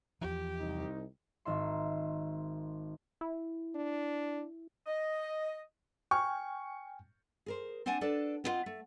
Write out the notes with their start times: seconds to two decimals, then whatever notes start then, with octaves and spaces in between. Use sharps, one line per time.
0.21 E2 F3 G4
0.59 C2 D#4
1.45 G#1 D#3 E5 C6
3.21 E4
3.75 D4
4.86 D#5
6.11 G5 G#5 C#6 F6
7.46 G#4 A#4 C5
7.86 C4 D4 D5 F#5 G#5 A5
8.01 D4 A4 B4 D5
8.44 B3 C4 E4 F4 D#5 F#5
8.66 A3